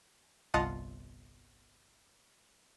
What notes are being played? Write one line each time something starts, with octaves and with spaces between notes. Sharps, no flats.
G1 C2 F4 D#5 F#5 A5